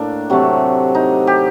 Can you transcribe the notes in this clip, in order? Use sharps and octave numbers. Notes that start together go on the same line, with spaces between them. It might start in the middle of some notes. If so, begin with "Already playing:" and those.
Already playing: A2 A#3 D4
C3 F#3 A3
D#4
G4